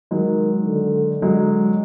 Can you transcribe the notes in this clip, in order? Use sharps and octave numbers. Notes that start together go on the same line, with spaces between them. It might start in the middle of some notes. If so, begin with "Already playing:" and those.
D#3 F#3 G#3
D3
D3 F#3 G#3